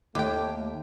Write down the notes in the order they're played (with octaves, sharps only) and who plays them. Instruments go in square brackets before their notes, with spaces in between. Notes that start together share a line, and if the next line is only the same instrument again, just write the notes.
[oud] D#2 [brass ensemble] A3 [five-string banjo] G4 G5